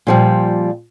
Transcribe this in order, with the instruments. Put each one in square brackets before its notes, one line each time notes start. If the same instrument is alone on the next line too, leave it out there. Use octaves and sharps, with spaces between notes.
[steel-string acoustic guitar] A#2 F3 G3